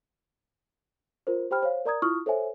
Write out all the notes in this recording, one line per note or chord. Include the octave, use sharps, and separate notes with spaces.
F4 A#4 C5
G4 C5 G5 B5 F6
C5 C#5 F5
A#4 D5 A#5 D#6 G#6
E4 F4 C#6 D#6 F6
A4 C5 C#5 E5 G#5